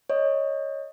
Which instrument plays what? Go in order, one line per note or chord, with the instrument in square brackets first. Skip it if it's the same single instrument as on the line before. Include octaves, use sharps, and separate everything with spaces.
[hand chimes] C#5 D#5